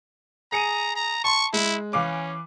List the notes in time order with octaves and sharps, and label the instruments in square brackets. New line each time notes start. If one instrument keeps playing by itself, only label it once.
[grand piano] G#4 C#7 D#7 [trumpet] A#5
[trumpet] A#5
[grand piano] A5 C6 [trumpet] C#6
[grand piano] G#3 [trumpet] E4
[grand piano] E3 F5 D6 [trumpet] C#4